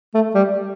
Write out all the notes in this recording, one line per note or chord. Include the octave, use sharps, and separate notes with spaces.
A3
G3